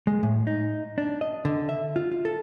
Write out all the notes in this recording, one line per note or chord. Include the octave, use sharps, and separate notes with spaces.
G#3
A2
D#4
D4
D#5
D3
E5
F4
F4
A4